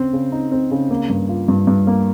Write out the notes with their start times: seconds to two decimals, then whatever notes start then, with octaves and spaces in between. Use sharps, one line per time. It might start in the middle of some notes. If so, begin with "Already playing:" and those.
Already playing: C#3 C4
0.13 C#3
0.32 D#4
0.52 C4
0.71 C#3
0.91 A#3
1.09 G2
1.29 F4
1.48 G2
1.67 G2
1.87 A#3